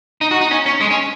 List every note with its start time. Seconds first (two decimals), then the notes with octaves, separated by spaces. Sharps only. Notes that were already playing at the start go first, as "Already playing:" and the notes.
0.21 D#4
0.31 F#4
0.41 D#4
0.51 C#4
0.66 C#4
0.81 G#3
0.90 C#4